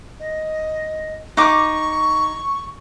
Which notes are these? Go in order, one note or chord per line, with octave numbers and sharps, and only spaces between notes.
D#5
D#4 C#6 D6